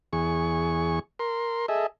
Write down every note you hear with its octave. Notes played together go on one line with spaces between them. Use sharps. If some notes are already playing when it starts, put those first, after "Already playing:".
E2 G#4 C#6
A#4 C6
G#4 A4 D#5 E5